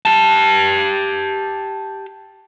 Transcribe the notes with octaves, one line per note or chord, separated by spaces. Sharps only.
G4 A5